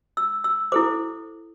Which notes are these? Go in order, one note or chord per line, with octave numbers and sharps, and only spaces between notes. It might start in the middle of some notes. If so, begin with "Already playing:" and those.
E6
E6
E4 A4 C5 D6